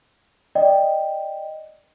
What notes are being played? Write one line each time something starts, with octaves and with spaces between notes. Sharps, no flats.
D5 D#5 G5